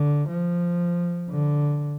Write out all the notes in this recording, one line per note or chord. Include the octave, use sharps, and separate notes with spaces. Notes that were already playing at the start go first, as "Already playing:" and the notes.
Already playing: D3
F3
D3